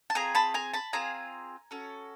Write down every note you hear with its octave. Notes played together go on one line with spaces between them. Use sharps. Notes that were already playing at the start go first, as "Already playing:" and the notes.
A5
C4 F4 G#4 G#5 A#5
A5 B5
G#5 A#5
A5 B5
C4 F4 G#4 G#5 A#5
C#4 F#4 A4